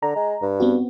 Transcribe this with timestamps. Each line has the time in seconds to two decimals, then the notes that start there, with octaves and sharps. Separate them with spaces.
0.03 D3 A#5
0.16 G#3
0.42 G2
0.60 B3 C4 F#4